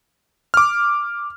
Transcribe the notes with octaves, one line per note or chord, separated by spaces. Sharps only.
D6 F6